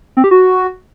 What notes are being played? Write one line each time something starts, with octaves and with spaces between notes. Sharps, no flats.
C4
G4
F#4